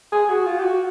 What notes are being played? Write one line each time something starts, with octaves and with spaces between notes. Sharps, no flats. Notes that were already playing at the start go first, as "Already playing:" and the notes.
G#4
F#4
F4
G4
F#4